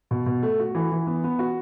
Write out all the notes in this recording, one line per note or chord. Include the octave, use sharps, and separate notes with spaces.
B2
B2
A3
F#4
E3
E3
B3
B3
F#4